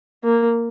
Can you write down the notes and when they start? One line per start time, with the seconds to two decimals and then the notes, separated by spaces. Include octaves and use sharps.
0.24 A#3